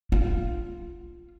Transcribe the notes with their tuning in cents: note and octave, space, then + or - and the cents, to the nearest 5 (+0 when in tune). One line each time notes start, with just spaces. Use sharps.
F4 -10